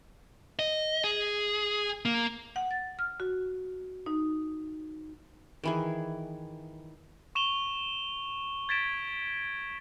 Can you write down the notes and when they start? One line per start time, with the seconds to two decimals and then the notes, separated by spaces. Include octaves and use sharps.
0.59 D#5
1.04 G#4
2.05 A#3
2.56 F#5
2.71 A6
2.99 F6
3.20 F#4
4.06 D#4
5.64 D#3 E3 G#4
7.35 C#6 E7 F7 G7
8.69 G#6 A6 B6 D7 E7